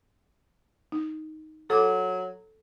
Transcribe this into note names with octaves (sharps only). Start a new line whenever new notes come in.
D#4
F#3 A4 D6